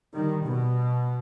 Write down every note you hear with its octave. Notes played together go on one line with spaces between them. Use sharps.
D#3 G3
B2